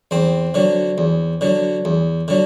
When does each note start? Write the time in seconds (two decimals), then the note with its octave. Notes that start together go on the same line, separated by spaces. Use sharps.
0.11 E2 C4
0.54 D3 F#3
0.98 E2
1.41 D3 F#3
1.85 E2
2.28 D3 F#3